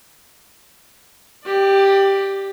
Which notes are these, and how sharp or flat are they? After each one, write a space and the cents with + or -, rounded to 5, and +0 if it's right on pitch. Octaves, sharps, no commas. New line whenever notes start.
G4 +0 D5 +25